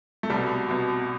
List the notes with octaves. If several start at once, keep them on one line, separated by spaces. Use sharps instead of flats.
A3
C2 B2 G3
C2 B2